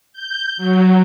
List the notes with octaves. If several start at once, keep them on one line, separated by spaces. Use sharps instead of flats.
G6
F#3